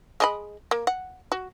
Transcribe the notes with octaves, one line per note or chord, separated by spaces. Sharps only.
G#3 D#5 B5
A#3
F#5
F#4